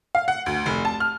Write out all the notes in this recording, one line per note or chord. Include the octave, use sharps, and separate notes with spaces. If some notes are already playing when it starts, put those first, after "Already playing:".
F5
F#5
D2
F1
A5
F6